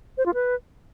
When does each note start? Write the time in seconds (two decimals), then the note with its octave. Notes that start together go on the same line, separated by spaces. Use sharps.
0.18 C5
0.26 F4
0.34 B4